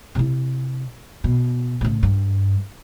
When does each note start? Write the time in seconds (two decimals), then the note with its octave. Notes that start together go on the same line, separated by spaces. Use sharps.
0.15 C3 E4
1.24 B2
1.81 A2 C#3
2.03 G2